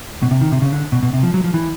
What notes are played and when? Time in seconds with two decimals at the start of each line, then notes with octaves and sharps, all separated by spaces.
0.22 B2
0.31 C3
0.41 D#3
0.52 C3
0.62 C#3
0.73 D3
0.92 B2
1.03 B2
1.13 C3
1.23 F3
1.34 F#3
1.44 F3
1.54 E3